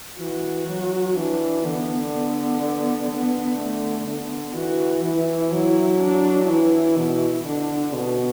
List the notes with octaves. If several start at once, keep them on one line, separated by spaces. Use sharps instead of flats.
E3 F#4
F#3
E3 D4
D3 B3
B3
B3
D3 B3
A3
D3 B3
E3 F#4
E3 E4
F#3 E4
D4
E3 E4
B2
D3 D4
B2 B3